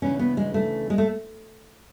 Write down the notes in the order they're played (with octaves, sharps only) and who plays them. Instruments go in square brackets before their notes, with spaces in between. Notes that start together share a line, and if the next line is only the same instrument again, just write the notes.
[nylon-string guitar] D2 C#3 E3 C#4
B3
G#3
A3
G#3
A3